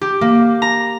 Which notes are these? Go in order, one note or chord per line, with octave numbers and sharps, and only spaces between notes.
G4
A#3
A#5